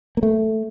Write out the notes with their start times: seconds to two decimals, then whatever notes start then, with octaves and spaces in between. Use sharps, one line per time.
0.17 A#3
0.23 A3